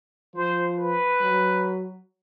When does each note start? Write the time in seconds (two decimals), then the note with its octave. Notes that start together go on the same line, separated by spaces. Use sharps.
0.35 F3 C5
0.78 B4
1.21 F#3